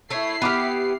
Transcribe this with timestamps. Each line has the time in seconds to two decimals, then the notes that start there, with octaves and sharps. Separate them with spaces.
0.10 A3 E4 C#5 C7
0.42 B3 G4 B5 D6 F6